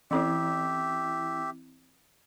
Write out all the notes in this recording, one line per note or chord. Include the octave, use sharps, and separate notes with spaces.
E3 C4 E4 G4 E5